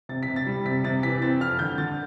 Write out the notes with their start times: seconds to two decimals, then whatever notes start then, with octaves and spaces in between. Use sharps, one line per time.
0.09 C3 A6
0.23 B6
0.28 C3
0.36 A6
0.46 G3
0.65 C3 B6
0.84 C3 A6
1.03 E3 B6
1.22 C4 A6
1.41 F2 F6
1.59 D3 G6
1.78 D3 A6